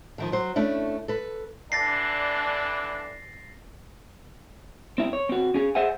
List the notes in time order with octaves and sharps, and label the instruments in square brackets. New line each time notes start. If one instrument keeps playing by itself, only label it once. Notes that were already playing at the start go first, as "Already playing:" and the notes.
[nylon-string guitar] D3 D#3 F3
F#3 C5
A3 C#4 D4 E4
A4 B4
[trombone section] D3 E3 D4 [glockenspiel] A6 A#6 C7
[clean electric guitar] C4 E4
C#5
C4 F#4
C#4 G#4
G#4 C5 E5 F#5 G#5